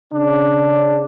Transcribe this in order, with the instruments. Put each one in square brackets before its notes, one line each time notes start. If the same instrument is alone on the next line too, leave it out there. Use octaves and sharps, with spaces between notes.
[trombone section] C#3 D4